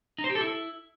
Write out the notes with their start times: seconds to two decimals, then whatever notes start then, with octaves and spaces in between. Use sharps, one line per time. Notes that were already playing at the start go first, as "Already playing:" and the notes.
0.18 D#4
0.24 C5
0.30 G4
0.35 A4
0.41 E4